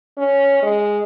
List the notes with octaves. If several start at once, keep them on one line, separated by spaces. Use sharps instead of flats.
C#4
G#3